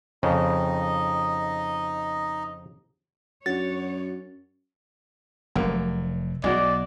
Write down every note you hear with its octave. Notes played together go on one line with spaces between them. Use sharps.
F2 C#3 D#4 D#5
F#2 D4 F#4 C#5 A6
F1 F#2 A#3
B1 G#3 F#4 D5